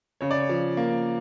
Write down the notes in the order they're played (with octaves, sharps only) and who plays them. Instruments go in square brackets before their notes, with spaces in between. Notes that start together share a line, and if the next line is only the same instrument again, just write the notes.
[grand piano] C#3 C#5
D5
C#5
F3
A#3